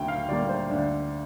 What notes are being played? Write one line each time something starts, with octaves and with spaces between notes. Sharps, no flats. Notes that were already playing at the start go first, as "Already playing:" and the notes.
Already playing: D2 D3 G5
F5
D3 G3 A#3 D5
C5
D2 D4